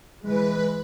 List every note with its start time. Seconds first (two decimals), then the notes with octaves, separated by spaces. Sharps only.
0.24 E3 G#3 B4